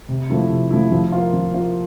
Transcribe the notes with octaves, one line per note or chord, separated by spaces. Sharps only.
C3
F3 A3 E4
C3
F3 A3 E4
F3
A#3 F4
F3
A#3 F4